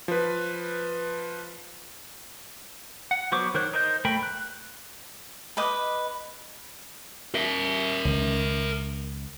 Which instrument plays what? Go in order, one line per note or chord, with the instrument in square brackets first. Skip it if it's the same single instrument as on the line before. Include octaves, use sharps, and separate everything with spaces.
[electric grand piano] F3 B4
[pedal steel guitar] F#5
F#3 B3 C5 C#6 D6
D#3 A#4 C5 C#5 F#6
D#4 A#4 C5 D#5 G6
A3 A#4 G5 B5
F#6
[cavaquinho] B4 D#5 D6
[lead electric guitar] A#4 E5
[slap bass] C#2 D#3